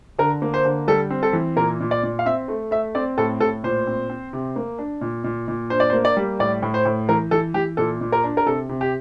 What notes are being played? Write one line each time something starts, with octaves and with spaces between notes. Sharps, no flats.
D3 A#4
A#3
C5
D3
G3 A4
C4
A4
E3
A#2 A#4
A#2
D5
A#2
F5
C4 E5
A3
A3 E5
C4 D5
A2 A4
A2 A4
A#2 C5
C4
C4
C3
A#3
D4
A#2
A#2
A#2
D4 C5
D5
C5
A#3
D5
G3
A2 D5
A2
C5
A2
E3 A#4
E3 A4
E3 G4
A#2 A4
A#2
A#4
D4
A#4
C3 A4
C3
G4